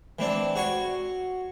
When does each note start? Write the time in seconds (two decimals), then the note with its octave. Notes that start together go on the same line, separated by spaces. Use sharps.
0.19 E3 C4 D4
0.55 F#4 C#5 C6